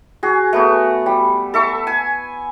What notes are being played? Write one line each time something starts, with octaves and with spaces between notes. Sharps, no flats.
F#4 G#4
A3 B3 F#4
G3
A4 E5 C#6
G#5